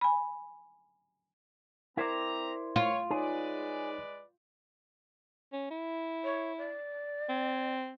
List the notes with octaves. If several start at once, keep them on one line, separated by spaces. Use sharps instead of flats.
G#5 B5
C4 E4 A#4 C5 D5 A#5
F4 C#5
G#3 D#4 G#4 B4 C#5 D5
C#4
E4
C#5
D5
C4